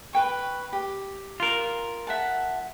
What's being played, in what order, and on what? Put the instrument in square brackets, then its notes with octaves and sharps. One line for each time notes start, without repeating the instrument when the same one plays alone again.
[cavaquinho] B4 G5 C#6
G4
[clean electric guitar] F4 A#4
[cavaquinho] E5 F#5 A5